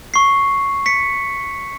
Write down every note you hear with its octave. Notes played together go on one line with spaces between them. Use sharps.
C#6 C7
B6 C#7